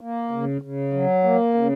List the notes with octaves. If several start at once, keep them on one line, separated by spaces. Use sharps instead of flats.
A#3
C#3
C#3
F#3
A#3
C#3